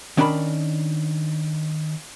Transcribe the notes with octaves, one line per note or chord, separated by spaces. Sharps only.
D#3 C#4 D4 A#4 B5